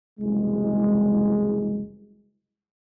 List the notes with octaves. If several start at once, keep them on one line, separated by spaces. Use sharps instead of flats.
F#1 C2 E3 G#3